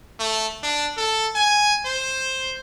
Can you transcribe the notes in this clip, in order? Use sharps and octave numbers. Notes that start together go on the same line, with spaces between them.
A3
D4
A4
G#5
C5